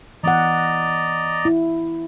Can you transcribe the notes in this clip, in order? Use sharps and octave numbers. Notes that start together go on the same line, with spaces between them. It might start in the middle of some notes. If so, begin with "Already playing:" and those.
E3 B3 D5 D#5 F#5 A#5
E4